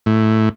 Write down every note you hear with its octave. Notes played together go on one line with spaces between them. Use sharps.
A2